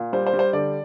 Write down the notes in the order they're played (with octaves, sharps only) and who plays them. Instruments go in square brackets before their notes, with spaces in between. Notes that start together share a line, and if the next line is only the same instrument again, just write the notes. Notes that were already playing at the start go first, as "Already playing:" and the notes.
Already playing: [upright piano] A#2
G3 C5
C5
G3
C5
D3 D5